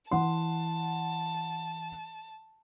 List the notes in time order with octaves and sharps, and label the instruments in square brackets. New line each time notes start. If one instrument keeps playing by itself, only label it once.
[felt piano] E3 F#5 C6 [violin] A5